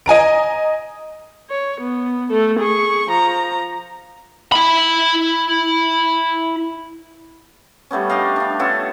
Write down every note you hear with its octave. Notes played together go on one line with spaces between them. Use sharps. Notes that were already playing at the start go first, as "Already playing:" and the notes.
D#5 G#5 A#5 D7
C#5
B3
A3 A4
G#4 C#6
F3 A#5
E4 B5
G3 A3 B3 C#4
D4 G4 D#5 F5
D4 F5
B3 C#4 F4 A4